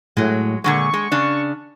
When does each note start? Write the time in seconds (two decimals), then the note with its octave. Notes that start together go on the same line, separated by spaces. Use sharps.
0.17 A2 F#3 G#3
0.64 A#2 D3 G#3 C#6
0.94 G#3
1.12 C#3 D4